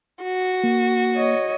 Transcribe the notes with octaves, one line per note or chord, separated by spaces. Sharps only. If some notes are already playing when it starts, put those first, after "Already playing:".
F#4
A#3
C#5 D#5